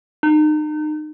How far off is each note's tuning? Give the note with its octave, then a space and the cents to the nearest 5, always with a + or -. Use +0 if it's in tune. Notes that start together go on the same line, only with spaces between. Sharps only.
D#4 -35